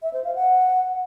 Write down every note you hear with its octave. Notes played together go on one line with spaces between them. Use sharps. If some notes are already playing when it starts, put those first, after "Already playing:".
E5
C5
F5
F#5